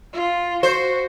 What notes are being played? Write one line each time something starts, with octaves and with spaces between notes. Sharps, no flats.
F4
F#4 C5